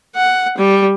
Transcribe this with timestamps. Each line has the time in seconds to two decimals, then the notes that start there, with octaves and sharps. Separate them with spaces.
0.16 F#5
0.58 G3